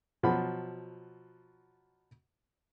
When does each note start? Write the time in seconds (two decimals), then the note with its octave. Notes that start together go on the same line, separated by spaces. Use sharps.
0.23 B2 F3 F#3 F#5 B5